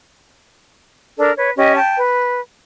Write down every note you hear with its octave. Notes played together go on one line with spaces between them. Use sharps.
D4 A4 A#4 D5
B4 C#5
C#4 G4 D#5
G5 A5
B4